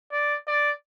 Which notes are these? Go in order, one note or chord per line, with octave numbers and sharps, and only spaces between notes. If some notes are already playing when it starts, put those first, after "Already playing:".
D5
D5